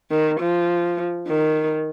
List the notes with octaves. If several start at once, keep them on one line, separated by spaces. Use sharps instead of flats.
D#3
F3
D#3